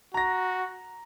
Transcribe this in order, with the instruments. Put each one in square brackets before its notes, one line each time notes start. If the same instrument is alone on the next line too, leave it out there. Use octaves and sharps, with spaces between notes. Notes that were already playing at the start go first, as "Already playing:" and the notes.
[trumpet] F#4 [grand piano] A#5 A#6